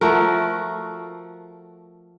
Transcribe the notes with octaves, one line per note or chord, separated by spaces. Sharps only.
F3 A3 F#4 A#4